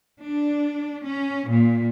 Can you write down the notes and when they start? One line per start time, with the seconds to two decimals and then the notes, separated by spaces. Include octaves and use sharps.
0.22 D4
1.05 C#4
1.49 A#2